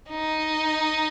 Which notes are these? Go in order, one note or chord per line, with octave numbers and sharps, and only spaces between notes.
D#4